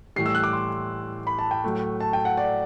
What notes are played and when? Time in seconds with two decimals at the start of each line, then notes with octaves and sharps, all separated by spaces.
0.16 A2 E3 G3 C7
0.26 E6
0.35 F#6
0.43 D6
0.53 C6
1.27 B5
1.39 A5
1.51 G5
1.64 A2 F#3 A3
2.01 A5
2.13 G5
2.25 F#5
2.37 D5